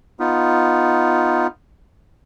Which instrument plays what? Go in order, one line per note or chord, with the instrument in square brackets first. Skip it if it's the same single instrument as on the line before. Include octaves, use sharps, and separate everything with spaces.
[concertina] B3 D#4 F4